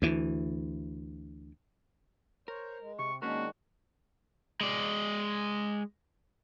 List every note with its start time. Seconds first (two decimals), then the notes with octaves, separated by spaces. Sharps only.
0.02 D2 E3
2.48 A#4 C5 C#5
2.81 G#3
2.99 C3 C#6
3.22 D#3 G#3 A#3 C#4 D4 F#4 A#4
4.61 G#3 D5